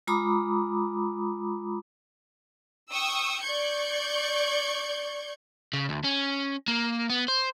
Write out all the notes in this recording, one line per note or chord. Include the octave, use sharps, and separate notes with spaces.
G#3 F4 A#5 B5 D6 D#6
G5 C#6 D#6 E6
D5 C#6 G6 G#6 C#7
C#3
D2
C#4
A#3
B3
C5